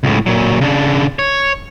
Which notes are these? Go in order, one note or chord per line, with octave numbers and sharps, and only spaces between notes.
C#2 A2
A#2 F#3
C#3 D4
C#5